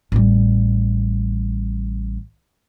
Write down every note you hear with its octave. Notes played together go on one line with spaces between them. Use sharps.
A1 G3